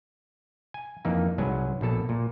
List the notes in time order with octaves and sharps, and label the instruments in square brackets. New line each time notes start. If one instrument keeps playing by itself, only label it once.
[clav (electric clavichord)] G#5
F2 E3 A#3 D#4
C2 G#2 F#3 B4 G#5
A#1 B2 A4 A5
A#2